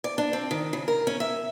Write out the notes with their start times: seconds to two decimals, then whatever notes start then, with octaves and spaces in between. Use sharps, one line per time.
0.04 D5
0.18 D4
0.33 C4
0.51 D#3
0.73 C#3
0.88 A#4
1.07 C#4
1.20 E5